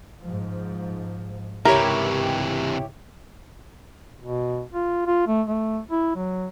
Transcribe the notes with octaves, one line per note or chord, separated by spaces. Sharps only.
G#2 F3
C#2 G#2 C3 E3 E4 G4 A#4 C#5
B2
F4
F4
A3
A3
E4
F#3